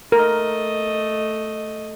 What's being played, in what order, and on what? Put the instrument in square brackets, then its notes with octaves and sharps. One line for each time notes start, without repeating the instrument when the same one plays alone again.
[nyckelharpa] A3 D#5 [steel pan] A#4